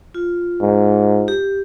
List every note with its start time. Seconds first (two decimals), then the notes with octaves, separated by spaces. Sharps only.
0.14 F4
0.61 G#2
1.28 G4